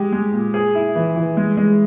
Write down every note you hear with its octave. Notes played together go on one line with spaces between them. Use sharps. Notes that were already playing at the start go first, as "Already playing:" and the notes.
Already playing: G#3 G4
G#3
A#2
G#4
E4
E3
E3
G#3
G#3